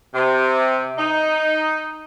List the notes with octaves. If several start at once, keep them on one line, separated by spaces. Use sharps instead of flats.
C3
D#4